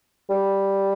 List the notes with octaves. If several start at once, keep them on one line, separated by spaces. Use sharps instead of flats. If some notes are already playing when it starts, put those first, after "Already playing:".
G3